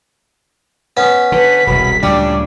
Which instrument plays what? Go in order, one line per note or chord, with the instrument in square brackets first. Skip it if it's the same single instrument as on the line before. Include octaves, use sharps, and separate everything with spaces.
[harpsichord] B3 C#4
[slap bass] D3 [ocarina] B4 [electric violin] B6
[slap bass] E1 C2 [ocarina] B5
[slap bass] D2 A#2 C#3 [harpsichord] G3 [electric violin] D4 [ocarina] D6